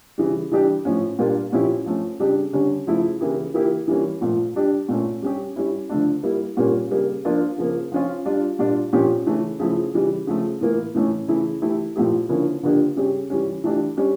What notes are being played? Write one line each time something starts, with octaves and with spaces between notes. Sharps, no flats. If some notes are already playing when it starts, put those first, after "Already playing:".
C#3 E3 G3
E3 G3 D4 G4
A2 F3 C#4
A#2 G3 A#3 D4 F4
A#2 F3 C#4 E4 G4
F3 A3 C#4
C#3 G3 D4 G4
D3 G3 C#4
C#3 F3 A3 E4
C#3 E3 A#3 E4 G4
E3 A#3 E4 G4
E3 G3 A#3 C#4
A#2 F3 A3
G3 D4 G4
A#2 A3 C#4
G3 C#4 G4
G3 C#4 E4
D3 F3 A3 D4
G3 A#3 E4
A#2 G3 A#3 C#4
C#3 G3 A#3
F3 A#3 D4 F4
C#3 F3 A#3
F3 C#4 F4
G3 D4 F4
A#2 G3 D4 F4
A#2 F3 C#4 G4
C#3 E3 A3 C#4
C#3 F3 A3 E4
C#3 E3 G3
C#3 F3 A3
A2 E3 A#3
A2 E3 A3 C#4 E4
C#3 E3 A3 E4
E3 A3 E4 G4
A#2 F3 A3 E4 G4
D3 F3 A#3 C#4 E4
D3 F3 A#3 D4 G4
C#3 G3 C#4 G4
E3 G3 C#4
E3 A3 D4 G4
G3 C#4 G4